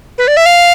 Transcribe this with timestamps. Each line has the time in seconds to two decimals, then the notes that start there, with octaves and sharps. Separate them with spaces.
0.18 B4
0.28 D5
0.37 E5
0.46 F5